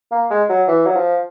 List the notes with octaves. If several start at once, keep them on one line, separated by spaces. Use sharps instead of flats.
A#3
G#3
F#3
E3
F#3
F3